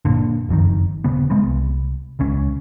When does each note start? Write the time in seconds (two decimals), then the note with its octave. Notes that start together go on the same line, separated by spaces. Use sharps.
0.05 G1 C2 A#2 D3
0.49 F#1 F2 A#2 D#3
1.04 D#1 C#3 B3
1.30 G#3 B3 C4
1.45 C2
2.19 D#1 C#2 C#4